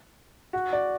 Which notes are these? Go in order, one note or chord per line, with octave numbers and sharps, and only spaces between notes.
F#4
D5